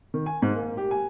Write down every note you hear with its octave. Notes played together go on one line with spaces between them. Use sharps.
D#3
G#5
G#2
A#3
G4
G#5